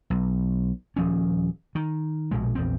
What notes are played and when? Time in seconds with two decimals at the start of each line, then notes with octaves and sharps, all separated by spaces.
0.10 B1
0.96 D#1 F3 C#4
1.75 D#3
2.31 A#1 B2 G#3
2.55 A#1 E2 C4